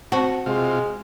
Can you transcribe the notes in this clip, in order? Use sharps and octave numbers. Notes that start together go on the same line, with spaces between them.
C4 F#4 C5 A5
C3 G#3 F4